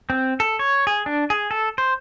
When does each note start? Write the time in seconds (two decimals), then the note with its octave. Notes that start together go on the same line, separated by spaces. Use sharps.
0.10 C4
0.40 A4
0.59 C#5
0.87 G#4
1.06 D4
1.30 G#4
1.51 A4
1.78 C5